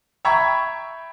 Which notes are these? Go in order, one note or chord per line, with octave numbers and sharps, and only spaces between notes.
E5 G5 A#5 B5 C#6 G#6